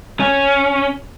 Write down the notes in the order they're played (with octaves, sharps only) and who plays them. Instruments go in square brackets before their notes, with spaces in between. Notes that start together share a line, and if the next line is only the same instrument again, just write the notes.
[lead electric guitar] C#4